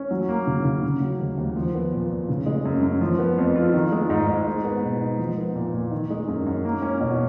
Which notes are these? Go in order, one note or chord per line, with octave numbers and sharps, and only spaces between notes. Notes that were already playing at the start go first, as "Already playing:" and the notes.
Already playing: C#4
F#3
A#3
C#3
C#3
C#3
F#3
D#2
D#2
F3
B3
A#2
A#2
C#3
G#3
F#2
F#2
F3
B3
F2
F4
D#3
G#3
G#2
G#2
G#3
B3
B2
D#4
F3
B3
A#2
A#2
D#3
G#3
F#2
F#2
A#3
C#4
B2